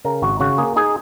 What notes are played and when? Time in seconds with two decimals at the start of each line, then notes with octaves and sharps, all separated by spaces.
0.05 C#3 A#4
0.22 G#1 F#4
0.40 C#3 F#4
0.58 A#3 G#4
0.76 D#4 G#4